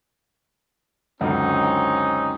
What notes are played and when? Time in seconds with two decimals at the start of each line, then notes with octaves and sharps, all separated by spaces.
1.21 C#2 F#2 D3 C4 C#4 D#4